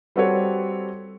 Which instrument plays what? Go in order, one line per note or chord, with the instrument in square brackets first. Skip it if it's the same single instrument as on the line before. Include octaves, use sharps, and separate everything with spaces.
[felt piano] G3 C4 F#4 A4 B4 C#5